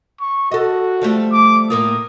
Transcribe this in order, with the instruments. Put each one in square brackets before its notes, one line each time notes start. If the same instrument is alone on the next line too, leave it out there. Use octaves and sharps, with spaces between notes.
[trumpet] C#6
[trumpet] F#4 [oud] A4 D#5
[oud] F3 G3 A3
[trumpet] D6
[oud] A2 A#3 F4 [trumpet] D#6